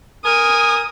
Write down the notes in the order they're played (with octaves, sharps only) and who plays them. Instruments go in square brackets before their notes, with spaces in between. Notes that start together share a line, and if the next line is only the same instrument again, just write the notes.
[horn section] A#4 G#5 [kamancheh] D#6